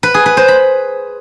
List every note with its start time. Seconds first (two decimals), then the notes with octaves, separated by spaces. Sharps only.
0.03 B4
0.14 G#4
0.26 B4
0.37 C5
0.48 B5